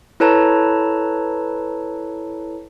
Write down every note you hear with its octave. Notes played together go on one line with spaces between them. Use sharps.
E4 A4 B4 C#5 A5 A#5